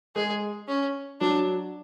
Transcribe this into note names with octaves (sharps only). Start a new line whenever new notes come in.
G#3 G#4
C#4
F#3 D4